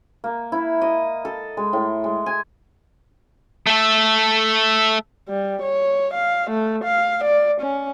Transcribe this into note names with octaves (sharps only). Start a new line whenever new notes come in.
A#3
E4
D#5
A4
G#3
A2
G#3
G#5
A3 A4
G3
C#5
F5
A3
F5
D5
C#4